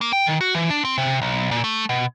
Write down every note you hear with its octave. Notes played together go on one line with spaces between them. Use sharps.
A#3
G5
D#3
F#4
E3
D4
C4
C3
B1
A#2
A3
B2